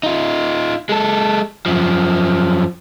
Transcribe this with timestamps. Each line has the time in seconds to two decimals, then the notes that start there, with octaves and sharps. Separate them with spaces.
0.03 D#4 F4
0.89 G#3 A4
1.66 F#2 F3